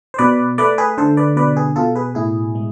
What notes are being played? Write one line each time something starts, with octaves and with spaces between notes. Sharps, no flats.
C5
B2 B4 D5
A3 B4 D5
G#4 B4
D3 A4 C5
B4 D5
B2 B4 D5
G#4 B4
B2 F4 A4
G#4 B4
A2 E4 G#4
G#3